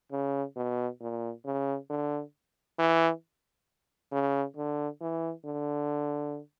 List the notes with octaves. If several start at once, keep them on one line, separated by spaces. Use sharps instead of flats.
C#3
B2
A#2
C#3
D3
E3
C#3
D3
E3
D3